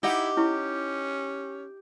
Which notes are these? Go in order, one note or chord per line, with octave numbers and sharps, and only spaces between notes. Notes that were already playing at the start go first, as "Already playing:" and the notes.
D#4 E4 G4 D#5 F#5
C#4 E4 C#6